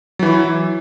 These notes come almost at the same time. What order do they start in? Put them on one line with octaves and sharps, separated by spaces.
F#3 E3 E4